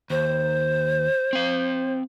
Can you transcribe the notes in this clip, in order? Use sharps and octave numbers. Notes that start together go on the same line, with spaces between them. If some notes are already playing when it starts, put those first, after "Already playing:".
D#2 C5
C4 F5